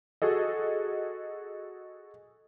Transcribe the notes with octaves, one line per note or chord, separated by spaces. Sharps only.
F#4 G#4 A4 D#5